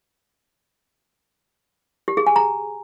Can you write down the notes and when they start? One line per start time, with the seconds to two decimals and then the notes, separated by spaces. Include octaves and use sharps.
2.08 G4
2.17 G#4
2.27 G#5
2.36 A#5